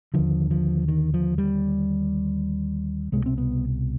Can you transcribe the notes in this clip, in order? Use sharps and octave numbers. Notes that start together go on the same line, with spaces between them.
D#2 D3 F3
F3
D#3
F3
G3
C2 B2 G#3
C4
B3